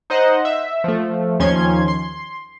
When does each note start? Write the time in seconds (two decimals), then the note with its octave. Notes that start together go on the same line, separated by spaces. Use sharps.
0.10 D#4 C5 D#5 F#5
0.45 E5
0.84 F3 A3
1.40 D#2 D#3 F3 C#4 C6 G#6
1.88 C6